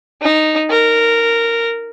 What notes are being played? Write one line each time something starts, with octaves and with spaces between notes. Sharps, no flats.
D#4
A#4